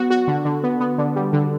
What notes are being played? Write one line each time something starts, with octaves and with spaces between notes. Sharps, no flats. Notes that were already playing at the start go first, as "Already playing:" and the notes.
Already playing: F#3 B3 F#4
F#4
D3
D3
B3
B3
D3
G3
D3